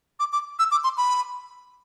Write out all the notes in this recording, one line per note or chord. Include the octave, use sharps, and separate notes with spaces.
D6
D6
E6
D6
C6
B5